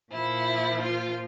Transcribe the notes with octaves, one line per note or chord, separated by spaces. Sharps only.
A#2 F3 E4
F4